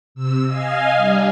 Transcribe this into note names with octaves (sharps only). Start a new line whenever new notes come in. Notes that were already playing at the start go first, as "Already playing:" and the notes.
C3 E6
D#5 F5 G#5
G3 D4